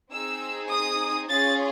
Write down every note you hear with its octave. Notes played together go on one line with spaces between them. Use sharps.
C4 D#4 G#4 E6
D#6
C#4 F4 G#4 A6